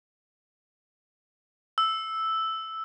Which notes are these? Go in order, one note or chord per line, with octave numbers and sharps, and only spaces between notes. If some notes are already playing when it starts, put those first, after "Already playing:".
E6